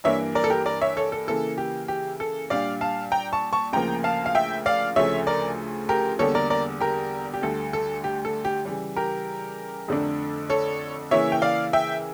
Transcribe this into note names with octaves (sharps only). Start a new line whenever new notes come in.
G2 E3 A#3 D4 C#5 E5
A#4 D5
A4
G4 A#4
A#4 D5
C#5 E5
A4 C#5
A4
C#3 E3 A#3 E4 A4
G4
G4
A4
A#2 G3 D4 D5 F5
F5 A5
G5 A#5
A5 C#6
A5 C#6
D2 C#3 F3 A#3 G5 A#5
F5 A5
F5
E5 G5
D5 F5
D2 C#3 F3 A3 C#5 E5
A#4 D5
G4 A#4
E2 D3 G3 A#3 A4 C#5
A#4 D5
A#4 D5
G4 A#4
G4
D2 D3 G3 A4
A4
G4
A4
G4
C#3 E3 G3
G4 A#4
F2 D3 A3 D4
A4 C#5
C#3 E3 A#3 E4 C#5 E5
G5
D5 F5
E5 G5